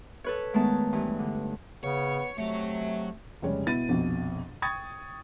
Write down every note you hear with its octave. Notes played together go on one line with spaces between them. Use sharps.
A4 B4 C#5
D#3 G#3 A3 B3 A5
G2 E3
D3
C#3 B3 C#5
C3 F#3 A3 C#5
F1 C#3 G3 G#3 C#5
B2 B3 E4 A6 D#7
A#1 F2 B2
G5 C#6 D#6 G#6 A6